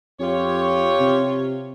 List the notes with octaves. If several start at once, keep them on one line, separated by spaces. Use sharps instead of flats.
F2 F4 G4 C#5
C3